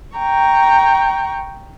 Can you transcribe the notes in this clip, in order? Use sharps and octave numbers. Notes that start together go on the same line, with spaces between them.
G5 A#5 C#6